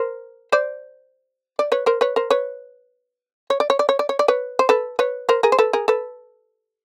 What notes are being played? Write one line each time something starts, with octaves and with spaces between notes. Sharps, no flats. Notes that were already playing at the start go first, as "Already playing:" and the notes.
Already playing: A#4 C5
C5 D5
D5
B4 C#5
A#4 C5
B4 C#5
A#4 C5
B4 C#5
C#5
D5
C#5
D5
C#5
D5
C#5
D5
B4 C#5
C5
A4 B4
B4 C#5
A#4 C5
G#4 A#4
C5
A4 B4
G#4 A#4
A4 B4